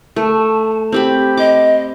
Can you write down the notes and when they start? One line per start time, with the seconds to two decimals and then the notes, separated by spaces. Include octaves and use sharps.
0.16 A3 A5
0.92 C4 G4 B5
1.37 D#5 D6